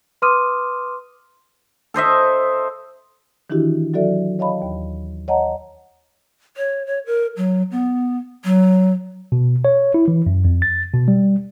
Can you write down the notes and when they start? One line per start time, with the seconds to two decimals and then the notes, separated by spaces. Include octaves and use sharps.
0.22 B4 C6 D6 D#6 F6 D#7
1.94 A4 C5 D#5 E5
3.50 D#3 E3 D4 E4 F#4 G4
3.94 F#3 F#4 A4 D5 E5
4.39 C#5 D#5 F5 A5 B5
4.62 D#2
5.28 C#5 D#5 F#5 A5 A#5
6.57 C#5
6.86 C#5
7.06 A#4
7.37 F#3
7.72 B3
8.44 F#3
9.32 B2
9.65 C#5
9.94 E4
10.08 E3
10.26 F#2
10.45 F2
10.62 A6
10.93 B2
11.08 G3